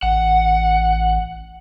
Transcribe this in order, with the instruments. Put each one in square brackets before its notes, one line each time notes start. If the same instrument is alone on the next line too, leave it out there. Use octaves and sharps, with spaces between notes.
[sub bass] A1 [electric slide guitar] F#5